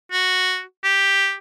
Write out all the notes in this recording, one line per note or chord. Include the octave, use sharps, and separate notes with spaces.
F#4
G4